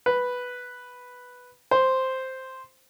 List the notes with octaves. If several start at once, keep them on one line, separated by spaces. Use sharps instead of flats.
B4
C5